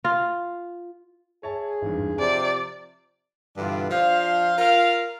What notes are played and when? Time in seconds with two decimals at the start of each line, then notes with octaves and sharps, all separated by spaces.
0.05 F4
1.43 G#4 C#5 E5 A5
1.82 G#1 E2 G2
2.19 C3 F3 D5 A5 D7
3.58 G2 B2 D3 E3 D4 F4
3.90 F3 D4 C5 F5
4.58 F4 A#4 F5